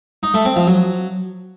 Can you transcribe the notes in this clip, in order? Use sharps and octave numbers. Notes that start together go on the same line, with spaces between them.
D#4
A3
C4
F3
F#3